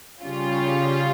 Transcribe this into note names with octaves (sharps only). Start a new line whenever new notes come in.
C#3 G3 C#4 F4